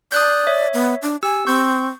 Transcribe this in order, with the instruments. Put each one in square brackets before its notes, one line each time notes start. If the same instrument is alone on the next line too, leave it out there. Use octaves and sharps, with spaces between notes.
[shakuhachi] D5 [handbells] D#6 F#6 G6
[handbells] C#5 E5
[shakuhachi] B3
D4
[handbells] G4 E6 [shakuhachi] G#5
[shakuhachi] C4 [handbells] C#6 G6